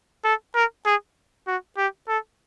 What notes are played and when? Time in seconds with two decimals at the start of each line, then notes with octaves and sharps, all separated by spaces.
0.24 A4
0.55 A#4
0.86 G#4
1.47 F#4
1.78 G4
2.08 A4